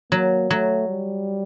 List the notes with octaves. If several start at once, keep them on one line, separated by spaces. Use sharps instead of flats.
F#3 A#3
F#3 A3
G3